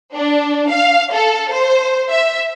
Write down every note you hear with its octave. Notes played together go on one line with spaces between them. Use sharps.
D4
F5
A4
C5
E5